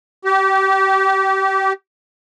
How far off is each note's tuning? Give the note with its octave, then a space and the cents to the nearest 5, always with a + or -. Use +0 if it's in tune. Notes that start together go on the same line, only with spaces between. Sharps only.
G4 -25